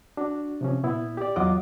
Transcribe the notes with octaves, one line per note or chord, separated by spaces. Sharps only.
D4 F#4
C3 F3 C#4
A#2 B3 E4
G4 D5
E2 F#3 F4 D#5 F#5 D6